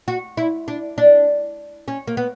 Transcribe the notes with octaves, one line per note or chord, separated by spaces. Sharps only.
F#4
E4
D4
D4
C#4
A#3
B3